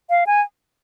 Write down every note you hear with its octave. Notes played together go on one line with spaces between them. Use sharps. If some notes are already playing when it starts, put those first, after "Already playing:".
F5
G#5